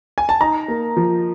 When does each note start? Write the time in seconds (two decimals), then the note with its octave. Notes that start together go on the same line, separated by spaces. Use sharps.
0.18 G#5
0.29 A5
0.41 D#4 A#5
0.68 A#3
0.97 F3